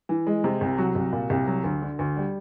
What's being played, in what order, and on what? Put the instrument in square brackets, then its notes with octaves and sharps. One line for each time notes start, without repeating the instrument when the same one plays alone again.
[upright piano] E3
G#3
C3
C2
F#3 F#4
C2
A#2
C2
F#3
D2
D3
D2
G3